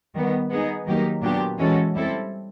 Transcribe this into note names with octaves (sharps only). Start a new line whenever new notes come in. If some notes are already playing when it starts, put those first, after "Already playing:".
D#3 G3 B3
G#3 B3 D#4 G#4
D#3 F#3 A#3 D#4 G4
A#2 F#3 B3 D4 G4
E3 G#3 C#4 F#4 A4
G3 C4 E4 A4